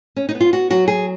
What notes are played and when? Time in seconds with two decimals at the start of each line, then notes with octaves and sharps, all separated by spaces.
0.16 C#4
0.29 D#4
0.35 B3
0.41 F4
0.53 F#4
0.70 F#3 F#4
0.88 G#4